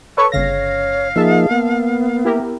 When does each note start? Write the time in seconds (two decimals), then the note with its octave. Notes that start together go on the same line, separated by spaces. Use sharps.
0.17 A4 B4 C#5 C#6
0.32 G1 C#3 C#5 F5 A#6
1.16 F3 A#3 D#4 G#4 E5 A5
1.51 A#3 B3
2.25 E4 G4 A#4